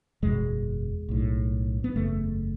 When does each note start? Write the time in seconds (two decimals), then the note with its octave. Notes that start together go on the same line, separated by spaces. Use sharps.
0.22 F#1 E2 B2 G#3
1.09 B1 A2
1.84 B3
1.96 F#1 E2 C#3 A3